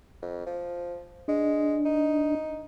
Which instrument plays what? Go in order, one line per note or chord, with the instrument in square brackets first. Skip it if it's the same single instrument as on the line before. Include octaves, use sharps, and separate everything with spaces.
[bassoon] F2
F3
[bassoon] G#3 [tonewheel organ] D4
[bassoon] D#4